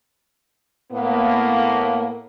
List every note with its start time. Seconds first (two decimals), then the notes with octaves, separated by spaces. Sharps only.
0.92 A2 A#3 B3